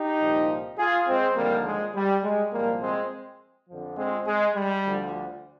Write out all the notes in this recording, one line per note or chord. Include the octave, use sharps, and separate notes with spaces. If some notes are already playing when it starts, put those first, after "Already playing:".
Already playing: D#4 G4
C2 A#2 F3
F4 G#4
G#3 C4
D#2 D3 F3 G3 A#3
G#3
G3
G#3
C2 A#2 F3 G3 A#3
G#3 C4
F2 D3 F3
G#3 C4
G#3
G3
D2 D3 F3